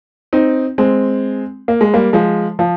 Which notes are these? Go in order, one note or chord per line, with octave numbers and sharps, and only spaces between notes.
C4 D#4
G#3 C4
A#3
G#3
G3 A#3
F3 G#3
F3